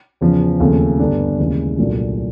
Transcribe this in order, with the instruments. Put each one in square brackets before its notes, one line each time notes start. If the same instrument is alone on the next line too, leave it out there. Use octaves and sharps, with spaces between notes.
[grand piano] E2 C#3 F3
D#2 C#3 F3 A3 C4
G2 D3 G3 B3 D4
D#2 C#3 E3 G#3
C2 A#2 F#3 A3 D4